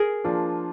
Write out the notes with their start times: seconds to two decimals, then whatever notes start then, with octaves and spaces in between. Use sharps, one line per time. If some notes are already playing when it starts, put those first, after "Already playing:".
Already playing: G#4 A#4
0.24 F3 A#3 D4 F4